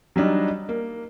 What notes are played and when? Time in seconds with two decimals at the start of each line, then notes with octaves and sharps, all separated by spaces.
0.16 F#3 G3 D4 D#4
0.69 A#3